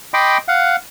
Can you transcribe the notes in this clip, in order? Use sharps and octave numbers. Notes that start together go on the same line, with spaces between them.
D#5 G5 B5 C6 D6
F5 F#5